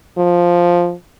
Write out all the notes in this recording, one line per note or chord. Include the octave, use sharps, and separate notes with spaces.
F3